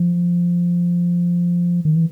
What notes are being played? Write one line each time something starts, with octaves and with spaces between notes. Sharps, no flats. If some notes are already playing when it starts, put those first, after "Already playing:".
Already playing: F3
D#3
E3